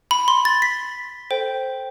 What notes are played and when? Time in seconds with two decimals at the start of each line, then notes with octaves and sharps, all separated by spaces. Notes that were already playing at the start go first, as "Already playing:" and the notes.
0.11 B5
0.28 C6
0.45 A6
0.62 B6
1.31 A4 C5 G5